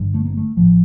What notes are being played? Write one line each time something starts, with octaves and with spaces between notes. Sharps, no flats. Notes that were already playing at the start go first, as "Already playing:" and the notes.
Already playing: G1 G2 D3
A3
A#3
A3
A1 A2 F3